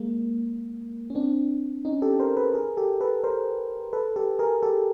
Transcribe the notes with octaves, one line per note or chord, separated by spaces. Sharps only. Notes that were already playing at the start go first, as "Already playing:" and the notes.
Already playing: G#3 A#3
C#4
C4 D4
C#4 D#4
G4 A4
A#4 C5
A4 B4
G#4 A#4
G4 A4
A4 B4
A#4 C5
A4 B4
G4 A4
G#4 A#4
G4 A4